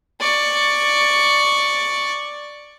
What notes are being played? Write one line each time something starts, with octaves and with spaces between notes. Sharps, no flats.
D5 C#6